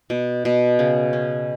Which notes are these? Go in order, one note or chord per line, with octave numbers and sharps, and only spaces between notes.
B2
B2
C#3
C#4